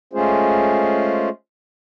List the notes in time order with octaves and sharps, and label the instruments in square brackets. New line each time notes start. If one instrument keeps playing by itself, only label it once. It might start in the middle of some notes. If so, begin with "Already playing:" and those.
[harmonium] G#3 A3 C#4 F4 G#4 C5